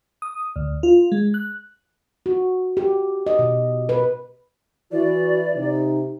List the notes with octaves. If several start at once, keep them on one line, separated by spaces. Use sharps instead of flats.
D#6
D2
F4
G#3
F#6
F#4
G4
D#5
B2
B4
E3 E4 F#4 D5
C3 D#4